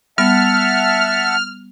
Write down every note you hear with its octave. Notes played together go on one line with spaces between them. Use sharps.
G3 B3 E5 F#5 A5 F6